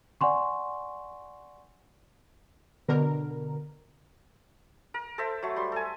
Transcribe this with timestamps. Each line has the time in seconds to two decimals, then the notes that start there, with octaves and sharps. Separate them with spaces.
0.21 D5 F#5 G#5 C6 C#6
2.88 B2 D3 A#4
4.94 A#4
5.18 A4 C5 E5
5.42 F#3 A3
5.56 G3 C6
5.72 A4 G#5